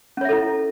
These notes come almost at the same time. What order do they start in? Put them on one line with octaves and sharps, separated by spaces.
C#4 C#5 E5 A4 E4